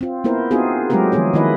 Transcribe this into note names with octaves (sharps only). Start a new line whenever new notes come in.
C4 F4
A#3 B3 E4 A#4 C5
B3 C4 D#4 F4 F#4 G#4
F#3 G#3 A3 C4 G4 A#4
D#3 F3 G#3 B3 G#4 C#5
D#3 F3 A#3 E4 B4 D#5